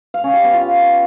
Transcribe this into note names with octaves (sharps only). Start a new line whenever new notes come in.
F5
C#4
G4
B3
F4